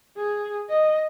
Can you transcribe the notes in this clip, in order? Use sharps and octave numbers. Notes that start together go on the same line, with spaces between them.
G#4
D#5